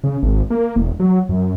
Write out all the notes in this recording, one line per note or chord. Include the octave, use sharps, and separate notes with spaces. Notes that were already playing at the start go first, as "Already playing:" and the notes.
C#3
G#1
A#3
E1
F#3
F#2